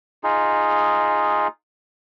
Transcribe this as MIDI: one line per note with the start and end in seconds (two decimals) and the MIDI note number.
0.24 1.47 63
0.24 1.47 65
0.24 1.47 68